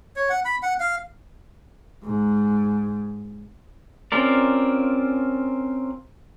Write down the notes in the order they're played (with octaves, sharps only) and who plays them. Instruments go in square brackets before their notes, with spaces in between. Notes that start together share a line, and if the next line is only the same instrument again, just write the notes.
[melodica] C#5
F#5
B5
F#5
F5
[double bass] G#2
[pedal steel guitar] C4 C#4 F4 A#4 D5